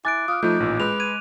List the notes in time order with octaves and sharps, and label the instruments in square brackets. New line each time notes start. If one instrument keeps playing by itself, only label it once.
[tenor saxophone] E4 [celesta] G#5 A6 [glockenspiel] D6 F#6 D7
[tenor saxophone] F4 [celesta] D#6 F6
[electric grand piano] F3 A3 [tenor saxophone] D#4 [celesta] F4 G6
[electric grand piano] A1 A#2
[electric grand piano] G#3 [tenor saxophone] B4 [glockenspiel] F#6 F7
[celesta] G#6 [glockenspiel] D#7